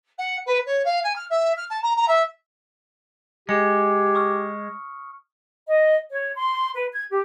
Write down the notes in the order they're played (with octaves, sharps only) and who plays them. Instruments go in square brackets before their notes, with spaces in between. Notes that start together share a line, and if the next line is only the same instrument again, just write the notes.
[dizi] F#5
B4
C#5
F5
G#5
F6
E5
F6
A5
A#5
A#5
E5
[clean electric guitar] G#3 [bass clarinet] G4 [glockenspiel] C#7
[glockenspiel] C#6 D#6 F6
[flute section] D#5
C#5
C6
B4
G#6
G4